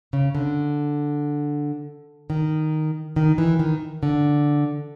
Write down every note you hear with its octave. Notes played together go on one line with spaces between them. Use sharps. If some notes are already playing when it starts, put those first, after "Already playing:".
C#3
D3
D#3
D#3
E3
D#3
D3